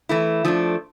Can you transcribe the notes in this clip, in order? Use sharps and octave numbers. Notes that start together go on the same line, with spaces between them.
E3 A3 E4
F3 A3 D4